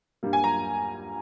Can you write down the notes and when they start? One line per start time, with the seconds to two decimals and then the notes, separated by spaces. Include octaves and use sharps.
0.23 G2 G3 A#3
0.33 G#5
0.44 A#5